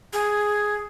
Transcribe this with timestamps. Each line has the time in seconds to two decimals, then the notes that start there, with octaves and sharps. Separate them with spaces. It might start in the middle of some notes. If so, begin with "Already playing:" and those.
0.13 G#4